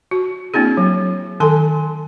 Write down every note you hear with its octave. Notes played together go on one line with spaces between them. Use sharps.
F#4
A#3 C4 D4 E4 G#4
F#3
D#3 A4 G#5 C6